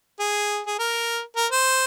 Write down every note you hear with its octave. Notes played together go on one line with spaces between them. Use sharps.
G#4
G#4
A#4
A#4
C5